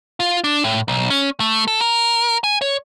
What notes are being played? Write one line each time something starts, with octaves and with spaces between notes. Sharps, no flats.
F4
D4
A2
B1
C#4
A3
A4
A#4
G#5
C#5